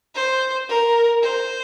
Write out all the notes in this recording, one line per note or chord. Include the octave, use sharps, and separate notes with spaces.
C5
A#4
C5